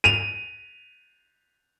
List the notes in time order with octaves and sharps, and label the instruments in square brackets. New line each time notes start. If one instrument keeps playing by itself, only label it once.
[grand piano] D#7 F7